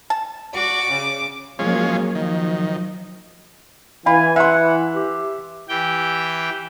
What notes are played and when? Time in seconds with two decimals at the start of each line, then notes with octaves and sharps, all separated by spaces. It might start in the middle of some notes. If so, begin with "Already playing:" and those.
0.10 A5
0.54 F#4 D5 D6
0.89 C#3
1.59 F3 F#3 G#3 A#3 C#4
2.15 D#3 F3 F#3
4.06 E3 F5 G#5 B5
4.36 E5 F#5 C6
4.95 G4
5.69 E3 G4 G5